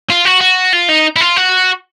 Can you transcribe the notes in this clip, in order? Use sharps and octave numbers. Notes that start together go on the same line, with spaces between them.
F4
F#4
F#4
F4
D#4
E4
F4
F#4